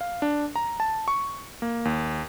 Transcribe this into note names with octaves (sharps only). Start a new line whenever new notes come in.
F5
D4
A#5
A5
C#6
A#3
D#2